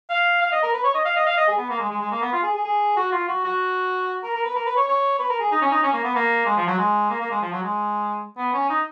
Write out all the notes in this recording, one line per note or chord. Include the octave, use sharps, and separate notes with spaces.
F5
F5
D#5
A#4
B4
C#5
D#5
F5
D#5
F5
D#5
G#4
B3
A#3
G#3
G#3
G#3
A#3
B3
F4
G#4
G#4
G#4
F#4
F4
F#4
F#4
A#4
A#4
B4
A#4
B4
C#5
C#5
B4
A#4
G#4
D#4
C#4
D#4
C#4
A#3
B3
A#3
G#3
F3
F#3
G#3
A#3
A#3
G#3
F3
F#3
G#3
B3
C#4
D#4